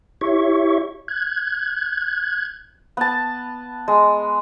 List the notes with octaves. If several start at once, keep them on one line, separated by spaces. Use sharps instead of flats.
E4 G4 C#5 E5 C#6
F#6 G#6
B3 A5
G#3